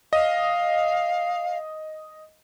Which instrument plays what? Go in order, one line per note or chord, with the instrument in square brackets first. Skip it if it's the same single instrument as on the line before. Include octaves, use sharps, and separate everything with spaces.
[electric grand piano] D#5 [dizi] F5